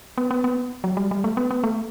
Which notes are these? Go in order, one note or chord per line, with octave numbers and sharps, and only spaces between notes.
B3
B3
B3
F#3
G3
G3
A3
B3
B3
A3